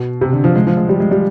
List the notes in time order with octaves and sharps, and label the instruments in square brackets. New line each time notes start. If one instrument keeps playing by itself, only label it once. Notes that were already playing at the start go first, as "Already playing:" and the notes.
Already playing: [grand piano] B2
C3
D3
F3
G#3
F3
G#3
G3
G#3
G3